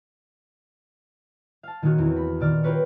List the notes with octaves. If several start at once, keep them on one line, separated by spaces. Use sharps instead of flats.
F5 A5
A#2 D#3 A#3 C#4 D#4 F#4
E2 C4
B5
A#2 D#3 D5 F6
F4 G4 A#4 B4 C#5